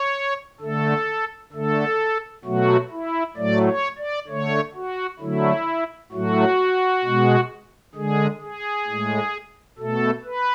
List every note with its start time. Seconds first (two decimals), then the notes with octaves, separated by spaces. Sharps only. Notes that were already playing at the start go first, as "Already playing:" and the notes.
Already playing: C#5
0.61 D3 A3 A4
1.53 D3 A3 A4
2.45 B2 F#3 A3 F#4
2.91 E4
3.36 A2 F#3 A3 D5
3.66 C#5
3.98 D5
4.28 D3 A3 C#5
4.74 F#4
5.20 D3 F#3 A3 E4
6.12 A2 F#3 A3 F#4
7.04 B2 G#3
7.95 D3 G#3 G#4
8.41 G#4
8.87 A2 G#3
9.78 B2 A3 A4
10.24 B4